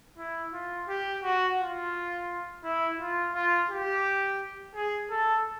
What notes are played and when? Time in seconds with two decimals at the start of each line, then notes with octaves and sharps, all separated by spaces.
0.18 E4
0.53 F4
0.88 G4
1.23 F#4
1.59 F4
2.64 E4
2.99 F4
3.34 F4
3.69 G4
4.75 G#4
5.10 A4